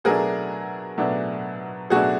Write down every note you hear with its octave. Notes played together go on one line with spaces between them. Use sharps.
B2 F#3 A3 D4 G#4 A#4
B2 F#3 A3 D4
B2 F#3 A3 D4 F#4 G#4